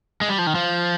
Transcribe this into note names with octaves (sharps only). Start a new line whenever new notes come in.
G#3
G3
F3
D#3
F3